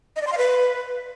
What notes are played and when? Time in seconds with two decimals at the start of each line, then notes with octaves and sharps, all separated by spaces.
0.16 D#5
0.21 D5
0.27 C6
0.32 F5
0.38 B4